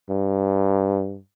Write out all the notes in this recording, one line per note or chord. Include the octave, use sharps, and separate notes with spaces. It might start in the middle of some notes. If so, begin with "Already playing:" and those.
G2